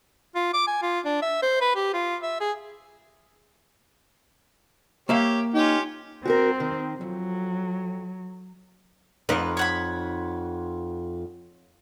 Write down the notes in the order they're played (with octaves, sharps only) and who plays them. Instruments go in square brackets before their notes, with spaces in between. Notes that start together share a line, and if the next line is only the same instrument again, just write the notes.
[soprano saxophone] F4
D6
G#5
F4
D4
E5
C5
B4
G4
F4
E5
G#4
[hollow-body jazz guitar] A#3 E5 F5 [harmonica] G4 C#5
[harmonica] C#4 F4 G4 [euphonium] D#4
[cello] C4 [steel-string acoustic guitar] F#4 G4 A#4
[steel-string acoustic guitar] D#3
[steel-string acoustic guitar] F2 [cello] F#3
[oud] F2 D#4 [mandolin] B4
[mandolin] C#5 F#5 B5